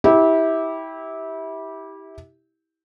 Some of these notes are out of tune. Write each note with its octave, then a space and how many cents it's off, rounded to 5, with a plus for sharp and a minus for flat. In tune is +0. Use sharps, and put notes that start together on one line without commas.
E4 -25 G4 +0